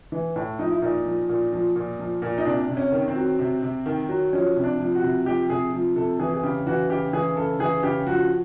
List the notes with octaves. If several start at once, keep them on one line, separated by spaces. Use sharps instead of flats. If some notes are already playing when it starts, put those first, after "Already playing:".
E3
A2
F3 D#4
E4
A#2 D#4
F3
A#2
F3
A#2
F3
A#2
D#4
C3 D4
C3
C#4
D#3
C4
F#3
C3
C3
D#3
F#3
F3 C#4
C3
D4
F3
F#4
C3
F3 G4
C3 G#4
F3
C3 A4
E3 G#4
G#4
C#3 G4
E3 F#4
C#3 G4
E3 G#4
C#3 A4
E3 G#4
C#3 G4
F3 F#4